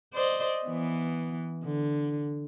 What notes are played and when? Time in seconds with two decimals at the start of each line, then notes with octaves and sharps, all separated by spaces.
0.13 C5 D5 D#5
0.66 E3 B3
1.64 D3